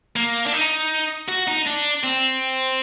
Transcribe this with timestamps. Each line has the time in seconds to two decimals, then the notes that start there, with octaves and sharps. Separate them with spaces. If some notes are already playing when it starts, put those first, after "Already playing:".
0.16 A#3
0.46 D4
0.53 D#4
1.29 F#4
1.48 D#4
1.67 D4
2.04 C4